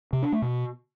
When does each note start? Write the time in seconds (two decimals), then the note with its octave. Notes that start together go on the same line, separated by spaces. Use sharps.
0.13 C3
0.23 D4
0.32 A3
0.42 B2